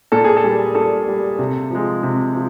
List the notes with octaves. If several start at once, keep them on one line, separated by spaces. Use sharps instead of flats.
A#2 A4
G#4
A4
G3
A#2 A4
G3
C3
F3 G#3
C3
F3